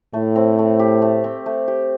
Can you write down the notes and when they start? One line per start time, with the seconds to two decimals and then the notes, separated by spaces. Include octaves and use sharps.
0.13 A2 A3
0.35 C4
0.59 A3
0.79 G4
1.02 A3
1.24 C4
1.46 A3
1.68 G4